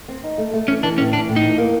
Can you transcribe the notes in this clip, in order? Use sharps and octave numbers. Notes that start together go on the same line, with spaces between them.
C4
D#4
A3
A3
E3 C#4
E3 D4
A2 C#4
E3 D4
A2
D#4
E3
A#3